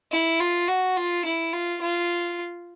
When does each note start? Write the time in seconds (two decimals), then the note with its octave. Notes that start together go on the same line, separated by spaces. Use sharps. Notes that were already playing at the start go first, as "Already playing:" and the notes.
0.12 E4
0.40 F4
0.68 F#4
0.97 F4
1.25 E4
1.54 F4
1.81 F4